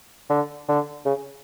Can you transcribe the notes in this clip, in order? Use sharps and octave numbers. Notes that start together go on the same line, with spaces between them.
D3
D3
C#3